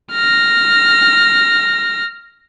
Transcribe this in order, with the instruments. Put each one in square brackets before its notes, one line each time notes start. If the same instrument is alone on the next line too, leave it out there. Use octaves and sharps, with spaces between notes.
[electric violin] F6 A#6